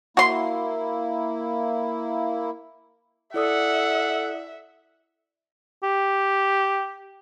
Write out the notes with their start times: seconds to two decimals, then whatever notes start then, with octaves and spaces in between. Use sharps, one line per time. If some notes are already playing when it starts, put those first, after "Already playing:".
0.17 A#3 E4 F#4 C6
3.34 E4 A4 D5 E5 F#5 D#6
5.83 G4